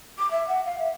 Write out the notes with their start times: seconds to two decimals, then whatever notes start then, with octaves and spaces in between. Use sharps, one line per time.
0.18 D6
0.31 E5
0.48 F#5
0.65 F5
0.79 E5